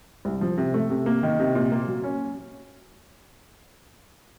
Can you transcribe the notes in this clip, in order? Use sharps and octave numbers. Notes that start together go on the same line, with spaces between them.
C2
F3
C3
A3
C3
A#3
D#3
C3
A#2
A#3
F#3
C#4